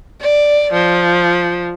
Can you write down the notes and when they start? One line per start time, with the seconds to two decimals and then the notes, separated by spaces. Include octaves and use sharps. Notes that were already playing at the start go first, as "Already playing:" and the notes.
0.21 D5
0.73 F3